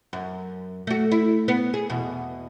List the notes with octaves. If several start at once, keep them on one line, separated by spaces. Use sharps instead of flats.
F#2
A3 F#4
E4
B3
G#4
E2 B2